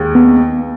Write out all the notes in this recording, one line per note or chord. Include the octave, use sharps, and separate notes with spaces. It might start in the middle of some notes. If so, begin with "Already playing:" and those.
Already playing: D#2 G#3
B3